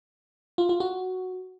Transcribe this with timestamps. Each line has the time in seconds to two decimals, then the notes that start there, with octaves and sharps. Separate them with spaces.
0.58 F4
0.69 F4
0.80 F#4